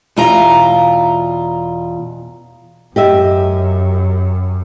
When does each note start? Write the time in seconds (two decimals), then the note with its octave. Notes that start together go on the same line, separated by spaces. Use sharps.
0.16 E2 B2 F4 E5 A#5
2.96 F#2 G4 D#5 E5